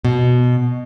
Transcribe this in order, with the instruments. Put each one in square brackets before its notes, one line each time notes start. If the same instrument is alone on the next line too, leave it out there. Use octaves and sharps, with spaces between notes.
[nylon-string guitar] B2